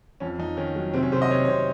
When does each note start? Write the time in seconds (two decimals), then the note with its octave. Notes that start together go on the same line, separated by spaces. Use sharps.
0.20 F2 C#4
0.39 F2 D#4
0.57 D#3 C#4
0.76 F#3
0.93 C3 C4
1.03 C#4
1.12 C3 C5
1.22 D#5
1.31 C3 C#5
1.45 C#5
1.49 C3 C5